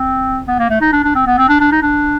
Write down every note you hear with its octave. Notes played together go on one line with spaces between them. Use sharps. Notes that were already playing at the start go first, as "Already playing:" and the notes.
Already playing: C4
B3
A#3
A3
D#4
D4
D4
C4
B3
C4
D4
D4
D#4
D4